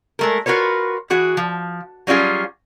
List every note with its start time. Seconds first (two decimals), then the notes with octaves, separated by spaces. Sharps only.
0.19 G#3 A3 A#4
0.46 F4 F#4 A#4 B4 C#5
1.10 E3 F#4 G#4
1.37 F3
2.07 F#3 G3 C#4 F4 G#4